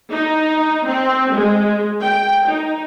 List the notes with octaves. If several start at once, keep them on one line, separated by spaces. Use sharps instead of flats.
D#4
C4
G#3
G5
D#4